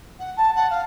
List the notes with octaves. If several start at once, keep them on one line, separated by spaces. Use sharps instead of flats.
F#5
A5
F#5
F5